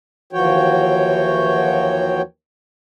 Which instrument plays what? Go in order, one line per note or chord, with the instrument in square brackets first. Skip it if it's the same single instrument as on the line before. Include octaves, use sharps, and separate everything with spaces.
[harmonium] D#2 E3 F3 F#4 C#5 G5